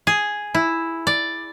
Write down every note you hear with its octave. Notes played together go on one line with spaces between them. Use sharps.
G#4
E4
D5